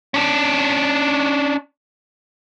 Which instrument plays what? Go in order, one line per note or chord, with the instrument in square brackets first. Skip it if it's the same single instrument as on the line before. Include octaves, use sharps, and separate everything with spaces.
[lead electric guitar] C#4 D4